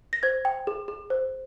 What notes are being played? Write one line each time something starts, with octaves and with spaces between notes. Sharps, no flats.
A#6
C5 G#6
G5
G#4
G#4
C5